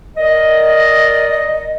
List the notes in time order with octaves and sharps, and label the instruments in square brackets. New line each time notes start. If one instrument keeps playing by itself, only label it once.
[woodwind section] A#4 D5 D#5